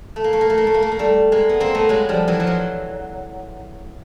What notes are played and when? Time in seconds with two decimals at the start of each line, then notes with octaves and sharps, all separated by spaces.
0.16 A3
0.24 A#3
0.33 A3
0.41 A#3
0.50 A3
0.58 A#3
0.67 A3
0.74 A#3
0.82 A3
0.92 A#3
0.99 G3 A3
1.32 G#3 A#3
1.49 B3
1.60 A#3 C4
1.75 A3 B3
1.89 F#3 G#3
2.09 F3 G3
2.28 E3 F#3
2.40 F3
2.47 E3 F#3